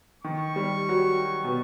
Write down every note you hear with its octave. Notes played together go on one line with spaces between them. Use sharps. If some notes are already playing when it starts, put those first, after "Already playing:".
D#3 C#6
G3
F#3
B2